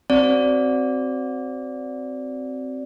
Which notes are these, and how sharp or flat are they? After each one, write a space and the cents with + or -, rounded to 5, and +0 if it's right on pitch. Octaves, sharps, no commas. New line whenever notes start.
C4 +0 F#4 +25 D5 -15